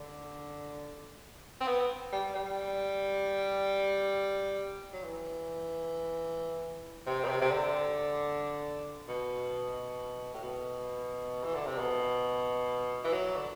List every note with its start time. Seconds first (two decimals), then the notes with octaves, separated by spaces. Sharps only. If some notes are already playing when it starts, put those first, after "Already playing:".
Already playing: D3
1.61 C4
1.67 B3
2.13 G3
2.35 G3
4.93 F#3
5.04 E3
7.07 C3
7.25 B2
7.29 C3
7.41 C3
7.51 D3
9.08 B2
10.34 A2
10.43 B2
11.44 E3
11.55 D3
11.66 C3
11.78 B2
13.04 E3
13.13 F#3
13.36 D3